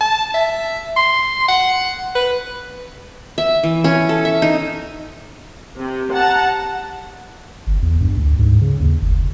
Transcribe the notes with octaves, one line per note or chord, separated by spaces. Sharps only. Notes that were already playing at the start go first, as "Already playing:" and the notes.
A5
E5
C6
F#5
B4
E5
E3
C#4
A4
E5
D#4
C3
F#5 A5 A#5
G1
E2
G2
D2
G#2
C#3
D#2
F#1
F1